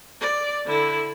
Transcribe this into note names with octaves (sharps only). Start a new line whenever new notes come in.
D5
D3 E4